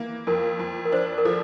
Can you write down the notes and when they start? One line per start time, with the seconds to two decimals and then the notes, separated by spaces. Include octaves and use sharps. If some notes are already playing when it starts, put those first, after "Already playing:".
Already playing: E3 A#3
0.27 F2 A#4
0.59 F2
0.85 A#4
0.92 D4 C5
1.18 A#4
1.25 F3 A4